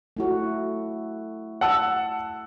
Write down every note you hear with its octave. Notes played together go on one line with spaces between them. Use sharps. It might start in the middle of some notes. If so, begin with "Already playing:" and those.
A3 E4 F#4
F#5 A5 E6